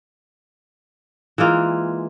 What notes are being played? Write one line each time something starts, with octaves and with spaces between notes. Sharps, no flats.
E3 G#3 A#3 F4